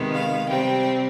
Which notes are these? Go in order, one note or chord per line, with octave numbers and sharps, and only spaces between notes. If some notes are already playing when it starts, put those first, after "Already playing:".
Already playing: C3 D#3 G#3 B3
F5
C3 G3 C4 G5